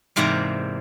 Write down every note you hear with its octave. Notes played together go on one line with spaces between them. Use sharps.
E2 G#2 C3 A#3 D5 A#5